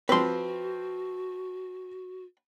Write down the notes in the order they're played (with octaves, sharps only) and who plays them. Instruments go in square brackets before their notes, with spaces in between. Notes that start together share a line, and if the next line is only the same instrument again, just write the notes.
[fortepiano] F3 C4 [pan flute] F#4 [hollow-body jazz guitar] B4 C6